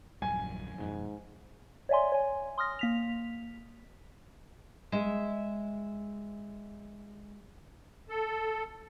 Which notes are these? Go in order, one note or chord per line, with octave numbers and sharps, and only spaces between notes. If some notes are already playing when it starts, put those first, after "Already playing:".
D#1 A#1 F#2 G3 G#5
F2 G#2 B2 D#3
C#5 D5 E5 G#5 C6
C#5 G#5
C6 D#6 F6 A#6
A#3 B6 F7
G#3 E5
A4